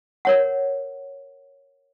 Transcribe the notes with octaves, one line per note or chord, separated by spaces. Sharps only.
A#4 C#5 F#5